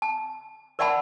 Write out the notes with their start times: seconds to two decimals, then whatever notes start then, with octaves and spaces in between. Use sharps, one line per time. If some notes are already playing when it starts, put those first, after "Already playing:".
0.02 A5
0.79 A#4 D5 E5 F#5 A5 B5